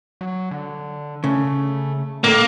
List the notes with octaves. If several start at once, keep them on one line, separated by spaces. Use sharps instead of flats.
F#3
D3
C#3 A3
A2 D3 A3 A#3